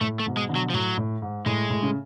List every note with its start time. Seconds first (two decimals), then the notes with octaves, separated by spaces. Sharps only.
0.01 A2 A3
0.20 A3
0.26 G#2 B2
0.37 G#3
0.49 B2 D3
0.55 F#3
0.70 F3
0.74 A2 F#3
0.97 A2
1.22 G#2
1.46 A2 G#3
1.70 A2
1.82 C#3